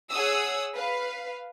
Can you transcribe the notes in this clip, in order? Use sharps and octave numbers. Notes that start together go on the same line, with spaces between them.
G#4 C#5 F#5 D#6 E6
B4 F5